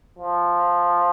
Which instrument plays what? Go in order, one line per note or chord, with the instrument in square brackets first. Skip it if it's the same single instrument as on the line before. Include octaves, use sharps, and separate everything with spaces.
[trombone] F3